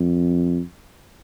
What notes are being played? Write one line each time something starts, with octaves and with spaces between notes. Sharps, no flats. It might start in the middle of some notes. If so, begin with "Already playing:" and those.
Already playing: F2